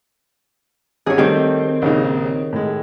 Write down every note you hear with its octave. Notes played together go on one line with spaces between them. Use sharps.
G#1 C#4 G4 G#4 C#5
D#3 G3 A3 C4 G4
A#1 C#3 D#4
A2 G#3